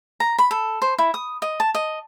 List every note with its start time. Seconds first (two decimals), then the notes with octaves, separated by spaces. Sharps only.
0.20 A#5
0.38 B5
0.51 A4
0.82 C5
0.98 E4
1.14 D#6
1.42 D#5
1.60 A5
1.75 D#5